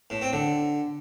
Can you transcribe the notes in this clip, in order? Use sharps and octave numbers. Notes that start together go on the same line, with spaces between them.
A2
C4
D3